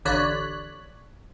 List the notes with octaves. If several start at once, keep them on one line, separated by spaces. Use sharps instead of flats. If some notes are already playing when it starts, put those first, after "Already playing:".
A1 D3 C#5 D5 F#6 B6